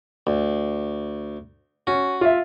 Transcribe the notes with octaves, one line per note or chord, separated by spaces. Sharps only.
D2
C#4 F#4
F4 E5